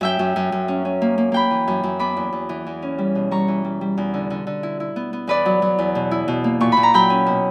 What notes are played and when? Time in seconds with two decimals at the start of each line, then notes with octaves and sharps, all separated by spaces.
0.01 F#2 E5 G5
0.19 F#2
0.36 F#2
0.52 F#2
0.68 C#4
0.85 C#4
1.02 A#3
1.18 A#3
1.32 A#3 G5 B5
1.51 E3
1.68 F#2
1.83 F#2
1.99 B3 B5 D6
2.17 E2
2.32 E2
2.49 E3
2.66 E2
2.82 C#4
2.98 G3
3.15 B2
3.31 G3 A#5 C#6
3.48 E3
3.64 G3
3.81 G3
3.97 E2
4.14 D3
4.30 D3
4.47 D3
4.63 E4
4.80 E4
4.96 B3
5.13 B3
5.27 E2 B4 D5
5.46 F#3
5.62 F#3
5.78 E2
5.95 B2
6.11 E4
6.28 B2
6.44 A#3
6.60 A#2 C#6
6.72 A#2 B5
6.83 A#5
6.94 F#3 G5 B5
7.10 C#4
7.26 B2